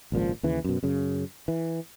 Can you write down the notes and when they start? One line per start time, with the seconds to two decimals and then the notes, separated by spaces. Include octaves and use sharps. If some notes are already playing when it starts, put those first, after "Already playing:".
0.12 G#1 C#2 A#2 F3
0.43 D#2 C#3 E3
0.64 F#2 B2
0.83 F#2 C#3
1.48 E3